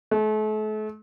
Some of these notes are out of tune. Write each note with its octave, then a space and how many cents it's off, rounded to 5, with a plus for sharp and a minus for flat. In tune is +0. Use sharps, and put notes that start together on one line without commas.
A3 -40